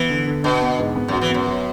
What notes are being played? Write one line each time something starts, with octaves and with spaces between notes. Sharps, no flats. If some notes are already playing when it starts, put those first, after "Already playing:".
Already playing: E3 B3
D3
D3
B2 D4
B3
G#2
B3
F#2
F#4
E3
F#2 B3
F#3